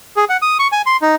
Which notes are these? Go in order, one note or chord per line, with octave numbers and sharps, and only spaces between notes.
G#4
F#5
D#6
C#6
G#5
C6
D#4